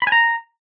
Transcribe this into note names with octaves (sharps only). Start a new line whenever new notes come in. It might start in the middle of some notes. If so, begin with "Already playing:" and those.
B5
G#5
A#5